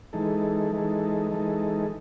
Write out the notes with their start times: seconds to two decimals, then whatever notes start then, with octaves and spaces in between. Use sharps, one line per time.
0.13 E3 G#3 D#4 A4
0.72 E3 G#3 D#4 A4
1.31 E3 G#3 D#4 A4